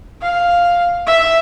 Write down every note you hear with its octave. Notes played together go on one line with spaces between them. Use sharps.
F5
E5